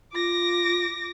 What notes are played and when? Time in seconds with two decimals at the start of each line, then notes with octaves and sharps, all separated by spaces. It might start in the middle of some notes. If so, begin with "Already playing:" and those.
0.14 F4 D6 A#6